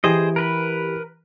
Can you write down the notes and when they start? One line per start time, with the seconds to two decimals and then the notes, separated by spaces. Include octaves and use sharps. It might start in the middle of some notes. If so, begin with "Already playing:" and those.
0.04 E3 G4 G#4 C5 D#5
0.36 A#4 B4 B5